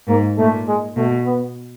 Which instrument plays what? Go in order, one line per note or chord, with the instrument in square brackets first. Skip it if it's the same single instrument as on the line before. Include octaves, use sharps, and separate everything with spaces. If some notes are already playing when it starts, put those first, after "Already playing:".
[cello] G#2 [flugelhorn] A#3
[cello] A#2 [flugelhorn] A3
[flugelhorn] G#3
[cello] B2 [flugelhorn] A3
[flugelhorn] B3